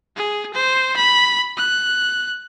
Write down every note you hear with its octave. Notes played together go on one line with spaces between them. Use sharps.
G#4
C5
B5
F#6